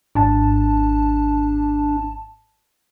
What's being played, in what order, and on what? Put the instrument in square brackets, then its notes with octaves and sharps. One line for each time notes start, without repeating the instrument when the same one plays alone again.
[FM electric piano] G#1 A5 [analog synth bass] D4